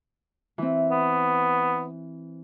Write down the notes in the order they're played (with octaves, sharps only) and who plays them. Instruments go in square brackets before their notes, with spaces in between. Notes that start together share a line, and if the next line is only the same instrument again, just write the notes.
[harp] E3 C4
[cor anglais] B3